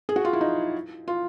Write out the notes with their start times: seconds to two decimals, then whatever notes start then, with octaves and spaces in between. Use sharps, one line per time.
0.09 G#4
0.16 F#4
0.25 F4
0.33 E4
0.41 D#4
1.08 F4